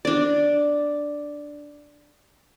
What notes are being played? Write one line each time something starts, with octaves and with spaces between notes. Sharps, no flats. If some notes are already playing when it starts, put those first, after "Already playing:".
D4 D5